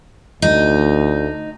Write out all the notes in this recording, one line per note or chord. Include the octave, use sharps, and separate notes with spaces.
D2 D#4